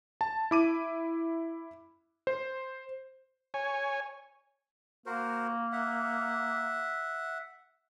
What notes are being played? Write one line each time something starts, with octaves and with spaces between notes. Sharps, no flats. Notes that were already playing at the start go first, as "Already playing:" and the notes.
A5
E4 D6 D#7
C5
C#5 G#5
A#3 F#4 A#4 C5
E5 F#5